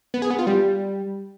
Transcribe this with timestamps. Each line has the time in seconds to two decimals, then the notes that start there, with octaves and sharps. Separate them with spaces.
0.14 B3
0.22 G#4
0.30 B3
0.39 F4
0.47 G3